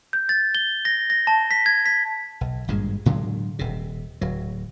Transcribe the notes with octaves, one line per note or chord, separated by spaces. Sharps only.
G6
A6
G7
A#6
A#6
A5
B6
G#6
B6
B1
G#1 G2 A#2 G#3
A2 D3 F#3 G#3
D#1 C3
D1 F#3